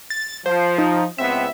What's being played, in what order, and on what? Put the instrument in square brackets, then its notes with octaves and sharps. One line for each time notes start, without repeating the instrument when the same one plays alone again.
[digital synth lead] A6
[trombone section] F3 [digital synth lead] C5
[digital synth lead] D#4
[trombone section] C#2 B3 C4 [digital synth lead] E5